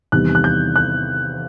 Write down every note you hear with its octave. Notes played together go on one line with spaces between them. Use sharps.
E2 C3 D#3 G3 B3 F#6
F#6
G6
F#6